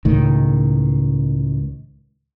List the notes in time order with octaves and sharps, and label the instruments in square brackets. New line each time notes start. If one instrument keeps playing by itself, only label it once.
[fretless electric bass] C#2 A2 D#3